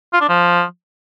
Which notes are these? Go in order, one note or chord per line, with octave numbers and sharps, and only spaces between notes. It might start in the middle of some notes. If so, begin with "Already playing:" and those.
F4
D4
F3